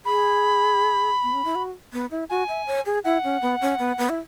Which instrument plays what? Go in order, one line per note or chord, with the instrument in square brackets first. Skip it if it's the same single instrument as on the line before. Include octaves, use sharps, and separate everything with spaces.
[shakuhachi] G#4 [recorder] B5
[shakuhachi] B3
C#4
E4
F#4
B3
E4
[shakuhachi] F#4 [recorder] G#5
[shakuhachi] E5
C#5
G#4
[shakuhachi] E4 [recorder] F#5
[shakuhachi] C#4
B3
C#4
B3
B3
E4